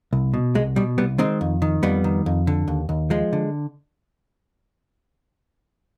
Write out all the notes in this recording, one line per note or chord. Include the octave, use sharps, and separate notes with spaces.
C2
B2
C2 G#3
B2 G3
C2 G3 B3
D#3 G#3 C4
F2
D#3
F2 G3 B3
D#3
F2
D3
D#2
D#2
F3 G#3
D3